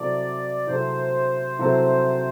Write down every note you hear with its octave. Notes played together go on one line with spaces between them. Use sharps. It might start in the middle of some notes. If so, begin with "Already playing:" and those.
Already playing: C3 F#3 C4 E4 A4 D5
C3 F#3 C4 E4 A4 C5
C3 F#3 C4 E4 A4